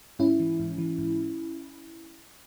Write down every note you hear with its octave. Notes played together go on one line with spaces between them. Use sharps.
G#2 C#4 E4
E3
G#2
E3
G#2